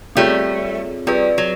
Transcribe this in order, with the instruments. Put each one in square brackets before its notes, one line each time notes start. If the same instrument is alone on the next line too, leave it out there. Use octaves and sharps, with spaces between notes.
[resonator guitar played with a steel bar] G3 A3 [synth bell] C4 F4 G#4 C#5
[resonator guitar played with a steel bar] G3 [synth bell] C4 F4 G#4 B4
[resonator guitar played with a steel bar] F#3